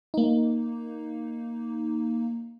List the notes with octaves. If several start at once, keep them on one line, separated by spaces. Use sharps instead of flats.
A#3 D#4